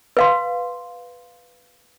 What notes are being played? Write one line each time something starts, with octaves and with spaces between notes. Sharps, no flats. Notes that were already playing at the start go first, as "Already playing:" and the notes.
B4 F5 C6